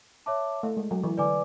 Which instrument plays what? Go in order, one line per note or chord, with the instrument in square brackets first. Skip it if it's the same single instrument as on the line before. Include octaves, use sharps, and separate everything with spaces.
[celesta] C#5 E5 A5 D6
[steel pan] A3
G#3
F#3
E3
[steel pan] D3 [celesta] B4 D5 G#5 D6